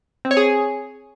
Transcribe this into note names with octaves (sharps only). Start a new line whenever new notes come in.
C4
C#5
G#4